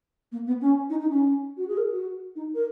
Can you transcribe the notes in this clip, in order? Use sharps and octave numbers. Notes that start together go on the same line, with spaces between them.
A#3
B3
C#4
D#4
D#4
C#4
F#4
G#4
A#4
F#4
D#4
A#4